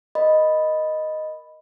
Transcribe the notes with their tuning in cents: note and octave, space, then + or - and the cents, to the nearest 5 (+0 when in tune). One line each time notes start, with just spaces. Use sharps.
A#4 +10 D#5 +0 B5 +0